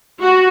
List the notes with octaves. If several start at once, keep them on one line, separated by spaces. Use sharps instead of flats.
F#4